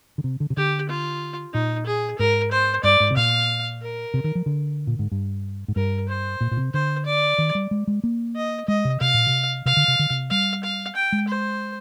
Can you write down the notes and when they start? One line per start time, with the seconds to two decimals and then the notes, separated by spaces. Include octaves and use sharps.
0.18 D3
0.24 C3
0.40 D3
0.50 C3
0.57 D3 G4
0.89 F4
1.54 A#2 D#4
1.87 G#4
2.19 G#2 A#4
2.52 C5
2.84 G2 D5
3.00 G#2
3.11 C3
3.17 A#2 F5
3.82 A#4
4.14 C3
4.24 D#3
4.35 F3
4.46 D3
4.87 A#2
4.99 G#2
5.12 G2
5.68 G#2
5.76 G2 A#4
6.09 C5
6.41 A#2
6.51 A#2
6.57 C3
6.74 D3 C5
7.06 D5
7.38 D#3
7.55 G3
7.71 G#3
7.87 G#3
8.04 A#3
8.36 D#5
8.68 G#3 D#5
8.85 C3
9.01 C3 F5
9.14 A#2
9.27 C3
9.66 C3 F5
9.77 D3
9.88 C3
9.99 D3
10.10 C3
10.30 G3 F5
10.63 F5
10.96 G5
11.12 G#3
11.28 C5